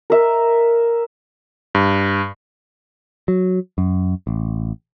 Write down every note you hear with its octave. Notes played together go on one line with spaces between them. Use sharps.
A#4 E5
G2
F#3
F#2
A1